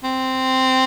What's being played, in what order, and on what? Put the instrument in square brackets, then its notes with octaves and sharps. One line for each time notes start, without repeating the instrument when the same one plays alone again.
[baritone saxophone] C4